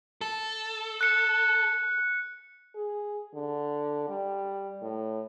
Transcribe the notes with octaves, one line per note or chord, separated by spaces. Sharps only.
A4
F#6 C#7
G#4
D3
G3
A2